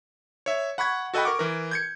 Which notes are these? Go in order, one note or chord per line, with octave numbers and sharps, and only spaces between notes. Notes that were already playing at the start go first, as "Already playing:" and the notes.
C#5 E5
F#5 B5 C#6 G#6
F#4 A4 D#5 F#5 G5 B5
A#4 C#6 D6
E3 A#4
G6 G#6 C#7